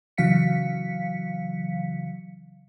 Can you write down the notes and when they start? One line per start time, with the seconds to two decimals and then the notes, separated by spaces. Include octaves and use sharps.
0.18 C#3 E3 F#3 F5 B6 C#7